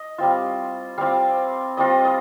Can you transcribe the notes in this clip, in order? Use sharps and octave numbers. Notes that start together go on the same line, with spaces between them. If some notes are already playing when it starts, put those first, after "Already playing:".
Already playing: D#5
G3 C4 F4
G3 C4 F4 F5
G3 C4 F4 D#5
D#5